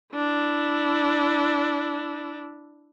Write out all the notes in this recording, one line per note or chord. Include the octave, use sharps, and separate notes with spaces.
D4 E4